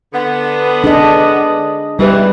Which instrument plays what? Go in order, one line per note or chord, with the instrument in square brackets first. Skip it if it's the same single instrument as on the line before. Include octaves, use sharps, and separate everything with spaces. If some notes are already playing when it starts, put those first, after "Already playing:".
[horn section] D3 B3
[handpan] D4 G#4 D#5
[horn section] G#2 E3 [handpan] G3 G4 B4